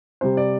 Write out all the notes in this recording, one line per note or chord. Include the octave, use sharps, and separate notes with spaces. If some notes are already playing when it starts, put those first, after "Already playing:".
C3 G3 C4 C5
D5